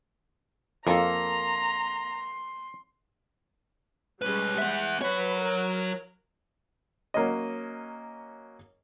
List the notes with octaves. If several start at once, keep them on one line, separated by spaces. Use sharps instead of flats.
F2 A#3 A4 A#5 C6
B1 G3 G#3 C#4 B4
B3 E5 F#5
F#3 B4 C#5
A#4
F#3 A#3 C#4 D#5